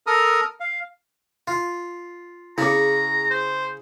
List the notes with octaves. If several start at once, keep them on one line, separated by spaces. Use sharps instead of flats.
A4 A#4 A#5 D#6 F6
F5
F4
C#3 C#4 E4 G#4 A#5
C5